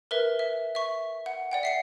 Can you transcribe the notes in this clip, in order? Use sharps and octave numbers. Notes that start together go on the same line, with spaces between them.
A#4 B4 E5
E5
E5 C#6
F#5
D5 F#5 G5
E5 C7 C#7